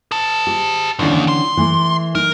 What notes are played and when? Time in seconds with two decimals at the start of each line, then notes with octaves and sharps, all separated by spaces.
0.11 G#4 A5
0.47 G4
0.99 D#2 D3 E3 C#4
1.28 C6
1.57 E3 A3
2.15 D#4 A#4